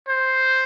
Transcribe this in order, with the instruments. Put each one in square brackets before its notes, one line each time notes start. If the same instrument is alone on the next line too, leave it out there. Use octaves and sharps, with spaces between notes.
[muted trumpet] C5